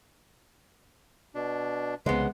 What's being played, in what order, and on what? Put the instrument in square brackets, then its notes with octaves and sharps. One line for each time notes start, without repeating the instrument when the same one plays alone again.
[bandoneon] B2 D4
[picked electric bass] C2 C#3 [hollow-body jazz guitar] G#3 B3 [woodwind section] C5 F#5 C6